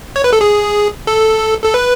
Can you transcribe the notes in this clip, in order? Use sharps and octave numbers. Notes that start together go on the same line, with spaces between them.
C#5
B4
A4
G#4
A4
A4
B4